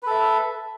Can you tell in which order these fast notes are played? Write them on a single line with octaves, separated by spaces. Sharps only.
B4 A4 E5